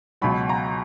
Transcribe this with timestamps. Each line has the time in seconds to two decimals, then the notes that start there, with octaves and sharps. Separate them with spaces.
0.22 C#2 B2 F#3 B5
0.49 A#5